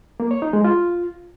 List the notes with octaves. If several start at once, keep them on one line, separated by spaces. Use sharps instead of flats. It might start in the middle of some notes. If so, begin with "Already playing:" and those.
A#3
C#5
D#4
G#3
F4